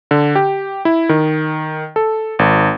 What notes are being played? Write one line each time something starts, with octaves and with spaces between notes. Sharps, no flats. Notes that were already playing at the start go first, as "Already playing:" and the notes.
D3
G4
E4
D#3
A4
G#1